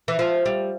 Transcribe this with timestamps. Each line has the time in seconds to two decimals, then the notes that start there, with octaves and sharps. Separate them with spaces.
0.08 E3
0.19 F3
0.46 G3